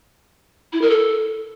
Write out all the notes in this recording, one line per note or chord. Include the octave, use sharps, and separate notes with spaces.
E4
A#4
A4